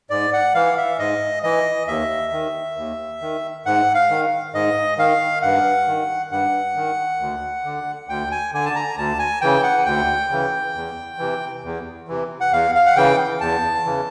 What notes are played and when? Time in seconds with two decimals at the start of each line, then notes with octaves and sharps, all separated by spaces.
0.10 G#2 D5
0.33 F#5
0.54 E3 F5
0.77 E5
0.99 G#2 D#5
1.43 E3 D#5
1.87 D#2 E5
2.32 D#3
2.77 D#2
3.21 D#3
3.66 G#2 F#5
3.94 F5
4.10 D#3
4.54 G#2 D#5
4.98 D#3 F5
5.42 G2 F#5
5.88 D#3
6.31 G2 F#5
6.76 D#3
7.20 D2
7.64 D3
8.08 D2 G5
8.31 G#5
8.53 D3 G#5
8.65 A5
8.76 A#5
8.97 D2 A5
9.19 G#5
9.41 C#3 E3 G5
9.63 F#5
9.86 D2 G5
10.31 C#3 E3
10.75 E2
11.19 C3 E3
11.64 E2
12.08 C3 E3
12.41 F#5
12.52 E2 F5
12.75 F5
12.86 F#5
12.96 C#3 E3 G5
13.41 E2 A5
13.85 C#3 E3